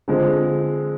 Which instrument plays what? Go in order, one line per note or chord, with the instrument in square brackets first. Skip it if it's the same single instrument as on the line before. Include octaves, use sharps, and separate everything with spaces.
[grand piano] D3 F3 G#3 C4